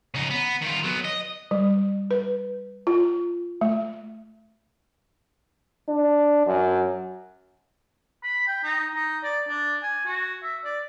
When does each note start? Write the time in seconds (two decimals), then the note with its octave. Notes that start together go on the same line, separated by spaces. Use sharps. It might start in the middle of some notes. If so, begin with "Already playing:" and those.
0.15 C#3 D#4
0.30 B3
0.61 D#3 F4
0.83 F#3 B3
1.04 D#5
1.51 G3
2.11 B4
2.87 F4
3.61 A3
5.89 D4
6.46 F#2
8.24 B5
8.48 G5
8.64 D#4
8.95 D#4
9.24 D5
9.48 D4
9.83 G#5
10.06 F#4
10.43 E5
10.65 D5